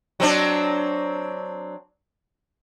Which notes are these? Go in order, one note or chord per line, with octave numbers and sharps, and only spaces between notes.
F#3 C4 D4